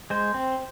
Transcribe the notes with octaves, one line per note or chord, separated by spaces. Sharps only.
G#3 C5
C4